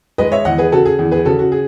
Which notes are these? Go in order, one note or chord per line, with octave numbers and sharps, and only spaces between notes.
G#3 B4 D#5
C#5 E5
E2 D#5 F#5
G#4 B4
C#3 F#4 A4
G#4
E2 G#4
G#4 B4
C#3 F#4 A4
F#4
G#4